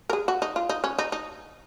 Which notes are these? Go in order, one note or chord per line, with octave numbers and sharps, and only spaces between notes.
A#4
G#4
F#4
D#4
F4
D#4
C#4
D#4
D#4